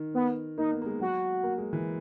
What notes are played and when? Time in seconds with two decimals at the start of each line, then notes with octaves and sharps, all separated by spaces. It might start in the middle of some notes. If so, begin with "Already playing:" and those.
Already playing: D#3
0.14 B3
0.58 A#3 D#4
0.71 B3
0.82 A#3
0.86 G#3
1.00 F#3 F#4
1.43 A#3
1.58 G#3
1.73 E3